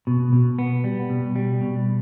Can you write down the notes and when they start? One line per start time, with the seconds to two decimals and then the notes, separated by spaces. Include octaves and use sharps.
0.07 B2
0.33 B2
0.59 B3
0.84 G3
1.10 B2
1.36 G3
1.61 B2